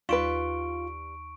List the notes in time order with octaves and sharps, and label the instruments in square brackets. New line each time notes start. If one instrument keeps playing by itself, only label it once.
[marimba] D#2 [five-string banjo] G3 B4 [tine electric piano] F4 [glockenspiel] C#6 D7